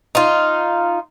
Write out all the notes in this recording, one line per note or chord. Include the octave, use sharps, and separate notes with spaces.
D#4 F4